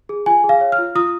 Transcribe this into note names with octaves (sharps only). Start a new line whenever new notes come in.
G#4
F4 G#5
G#4
F5
C#5
F6
F4
F4 D#6